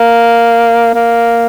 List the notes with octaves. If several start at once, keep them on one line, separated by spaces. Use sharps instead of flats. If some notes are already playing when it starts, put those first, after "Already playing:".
Already playing: A#3
A#3